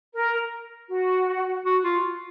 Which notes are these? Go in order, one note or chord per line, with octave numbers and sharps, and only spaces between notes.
A#4
F#4
F#4
F4